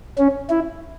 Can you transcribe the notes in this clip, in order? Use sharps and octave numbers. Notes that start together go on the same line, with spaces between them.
C#4
E4